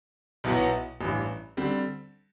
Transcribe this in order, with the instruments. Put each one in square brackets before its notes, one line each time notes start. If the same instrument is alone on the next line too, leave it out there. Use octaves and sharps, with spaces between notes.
[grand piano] B1 B2 F#3 B3 E4
A1 G2 E3
D3 G3 C4